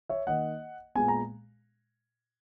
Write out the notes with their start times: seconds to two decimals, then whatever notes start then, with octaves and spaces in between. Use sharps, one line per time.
0.09 C#5 E5
0.27 D#3 A#3 D#5 F#5
0.95 A#2 G#3 B3 G#5
1.08 A#5